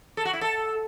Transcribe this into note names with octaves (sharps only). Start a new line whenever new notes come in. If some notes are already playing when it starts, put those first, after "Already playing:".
A4
F#4
E4
A4